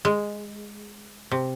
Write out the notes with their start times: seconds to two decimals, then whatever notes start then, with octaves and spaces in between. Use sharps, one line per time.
0.05 G#3
1.31 C3